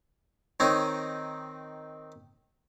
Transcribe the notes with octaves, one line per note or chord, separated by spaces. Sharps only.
D#3 C4 D#4 C#5